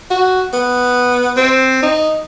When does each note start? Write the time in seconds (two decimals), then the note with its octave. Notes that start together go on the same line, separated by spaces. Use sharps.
0.11 F#4
0.53 B3
1.37 C4
1.83 D#4